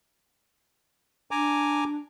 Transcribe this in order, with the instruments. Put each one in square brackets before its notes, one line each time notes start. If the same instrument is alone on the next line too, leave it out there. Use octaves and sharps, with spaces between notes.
[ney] D4 [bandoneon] G#5 A#5 D6